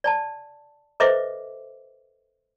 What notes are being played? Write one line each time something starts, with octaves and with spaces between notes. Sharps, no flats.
D5 G#5 A5
A4 B4 C5 D#5 E5 D6